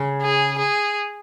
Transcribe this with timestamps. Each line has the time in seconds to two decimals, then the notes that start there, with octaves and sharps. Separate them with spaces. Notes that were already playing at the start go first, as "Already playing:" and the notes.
Already playing: C#3
0.22 G#4
0.58 G#4